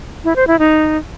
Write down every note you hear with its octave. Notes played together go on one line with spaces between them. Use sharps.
E4
C5
E4
D#4